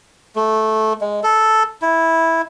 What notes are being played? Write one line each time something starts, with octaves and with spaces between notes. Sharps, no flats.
A3
G#3
A4
E4